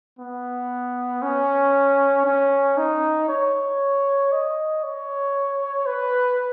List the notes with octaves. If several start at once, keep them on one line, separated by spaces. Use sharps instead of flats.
B3
C#4
C#4
D#4
C#5
D#5
C#5
B4